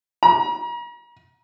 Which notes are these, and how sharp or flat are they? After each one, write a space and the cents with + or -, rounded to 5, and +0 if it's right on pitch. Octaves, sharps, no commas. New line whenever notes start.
A#5 +40